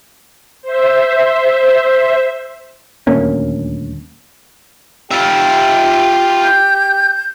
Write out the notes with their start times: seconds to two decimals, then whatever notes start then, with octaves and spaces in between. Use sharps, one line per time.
0.62 C5 E5
3.07 D#1 D2 A#3 C#4
5.11 F4 G4 E5
6.44 G6